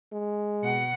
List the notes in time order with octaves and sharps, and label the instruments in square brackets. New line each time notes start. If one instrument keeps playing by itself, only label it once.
[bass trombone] G#3
[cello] B2 F#5